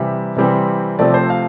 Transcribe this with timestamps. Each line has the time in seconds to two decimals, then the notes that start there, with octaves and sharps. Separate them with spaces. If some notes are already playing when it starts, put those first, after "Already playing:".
Already playing: C3 E3 G3 E5
0.37 C3 E3 G3 C4
0.99 C3 F3 A3 C4 D5
1.14 C5
1.30 F5